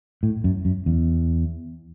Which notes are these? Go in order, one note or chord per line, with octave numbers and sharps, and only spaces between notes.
A2
F#2
F#2
E2